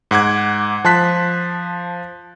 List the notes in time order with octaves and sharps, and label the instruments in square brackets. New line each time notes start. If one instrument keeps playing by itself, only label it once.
[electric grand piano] G#2 F#5 D6 G#6
F3 A5 C6 F#6 B6